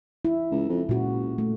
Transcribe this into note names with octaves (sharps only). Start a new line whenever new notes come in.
E4
C#2
F2
C#2 A#2 F#4
A3